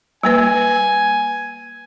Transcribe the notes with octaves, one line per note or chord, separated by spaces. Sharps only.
G3 A#3 B4 G#5